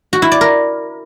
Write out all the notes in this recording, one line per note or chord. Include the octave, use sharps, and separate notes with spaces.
F#4
E4
D5
A#4